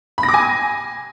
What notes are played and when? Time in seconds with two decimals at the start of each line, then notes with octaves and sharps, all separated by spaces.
0.18 B5
0.23 A#6
0.29 D6
0.34 G#5